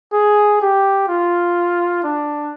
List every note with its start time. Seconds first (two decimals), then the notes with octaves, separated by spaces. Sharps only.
0.13 G#4
0.61 G4
1.08 F4
2.04 D4